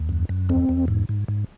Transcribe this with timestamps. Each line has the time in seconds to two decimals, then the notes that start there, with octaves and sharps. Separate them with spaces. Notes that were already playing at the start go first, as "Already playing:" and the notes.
Already playing: D#2
0.09 F#2
0.29 F#2
0.49 E2 C4
0.69 E2
0.88 G#2
1.09 G#2
1.28 G#2